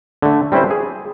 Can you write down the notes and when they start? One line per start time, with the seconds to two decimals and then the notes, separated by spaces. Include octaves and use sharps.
0.22 D3 A3
0.52 G3 C4 C#4 E4 B4 C5
0.71 G#4